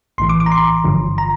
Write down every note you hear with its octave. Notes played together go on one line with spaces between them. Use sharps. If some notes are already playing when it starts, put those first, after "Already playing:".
A#1 A2 E3 C6
D6
D6
A#5
C6
G1 G2 D3 F3
A#5